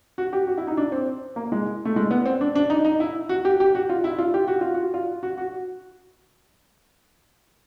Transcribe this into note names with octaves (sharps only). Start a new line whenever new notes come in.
F#4
G4
F#4
E4
D#4
D4
C4
A#3
G#3
A3
G#3
B3
C4
D4
D4
D#4
D#4
E4
F#4
G4
G4
F#4
F4
E4
F4
G4
F#4
F4
F#4
F4
F#4
F#4